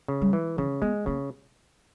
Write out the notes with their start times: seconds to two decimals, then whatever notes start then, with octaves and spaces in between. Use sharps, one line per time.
0.08 C#3
0.21 G3
0.33 E3
0.58 C#3 E3
0.82 G#3 B3
1.06 C#3 A#3